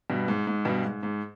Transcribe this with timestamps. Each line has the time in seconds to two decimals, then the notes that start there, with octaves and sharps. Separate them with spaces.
0.10 G2 B2
0.28 G#2
0.47 G#2
0.65 G2 B2
0.84 G#2
1.03 G#2